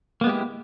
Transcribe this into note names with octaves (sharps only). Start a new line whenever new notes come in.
G#3 A#3 B3 E4 G4